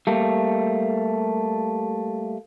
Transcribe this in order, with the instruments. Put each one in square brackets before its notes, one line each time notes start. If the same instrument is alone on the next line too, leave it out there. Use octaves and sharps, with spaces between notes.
[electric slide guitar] G3 A3 A#3